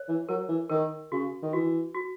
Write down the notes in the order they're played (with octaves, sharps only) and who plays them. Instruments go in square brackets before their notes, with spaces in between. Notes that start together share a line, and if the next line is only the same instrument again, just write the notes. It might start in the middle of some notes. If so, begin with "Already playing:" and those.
Already playing: [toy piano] C#5
[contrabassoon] E3
[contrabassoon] F#3 [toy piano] A#4
[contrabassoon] E3
[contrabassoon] D#3 [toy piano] A#4
[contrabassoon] C#3 [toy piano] F#4
[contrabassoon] D#3
[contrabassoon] E3 [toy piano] F#4
[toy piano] F#4